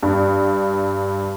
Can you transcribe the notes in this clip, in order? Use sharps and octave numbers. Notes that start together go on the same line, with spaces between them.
G2